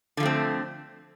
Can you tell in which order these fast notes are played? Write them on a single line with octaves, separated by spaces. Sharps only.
D3 F3 A3 C4